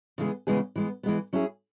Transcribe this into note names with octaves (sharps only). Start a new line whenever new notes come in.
C#3 E3 G#3 B3 G#4
C#3 E3 G#3 B3 G#4
E3 G#3 B3
E3 G#3 B3
F#3 C#4 E4 G#4